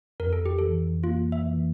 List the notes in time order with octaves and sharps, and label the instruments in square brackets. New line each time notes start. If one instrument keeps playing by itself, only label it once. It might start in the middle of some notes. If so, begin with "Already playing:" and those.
[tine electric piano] F2 [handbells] A#4
[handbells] A4
G4
[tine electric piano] E3 [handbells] A4
[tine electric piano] A#3 [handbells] F4
[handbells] E5
[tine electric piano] E3